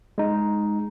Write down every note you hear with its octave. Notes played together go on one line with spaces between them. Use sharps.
G#3 D#4